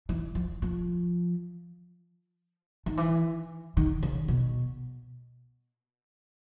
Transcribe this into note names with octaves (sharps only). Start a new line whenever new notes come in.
E3
F3
F3
D#3
E3
D#3
C#3
B2